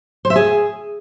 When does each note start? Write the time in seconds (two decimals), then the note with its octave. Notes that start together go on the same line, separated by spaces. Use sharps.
0.25 C5
0.30 E5
0.36 G#4